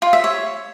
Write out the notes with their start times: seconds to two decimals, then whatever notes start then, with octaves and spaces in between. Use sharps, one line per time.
0.02 F4
0.13 E5
0.24 C#5